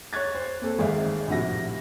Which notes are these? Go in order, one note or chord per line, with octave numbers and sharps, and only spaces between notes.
C#5 C#6 F#6 G#6 A6
C5
A#3 C4 A4 C5
G#1 D#3 G#4 D5 E5 F5
A#1 A2 C3 F#4 A#6